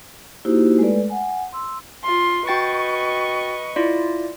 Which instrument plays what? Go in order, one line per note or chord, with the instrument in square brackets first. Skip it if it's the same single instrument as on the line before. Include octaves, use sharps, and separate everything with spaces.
[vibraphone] A#3 D#4 E4 F#4 G4 C5
G#3 A3 A4 B4 D5
F#5 G#5
C6 E6
[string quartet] F4 C6
[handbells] F#4 G5 A6 [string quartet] B4 D#5 C#6
[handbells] E4 F4 D5